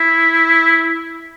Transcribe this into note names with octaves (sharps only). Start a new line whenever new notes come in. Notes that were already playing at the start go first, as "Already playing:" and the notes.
Already playing: E4